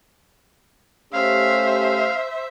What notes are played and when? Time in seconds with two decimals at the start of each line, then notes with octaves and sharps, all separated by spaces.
1.13 A3 C#4 G4 C5 E5 F5